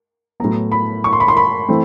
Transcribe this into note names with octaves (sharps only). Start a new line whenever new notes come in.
A2 F#3 B3 A#5
B5
C#6
C6
B5
C6
B5
E3 A3 C4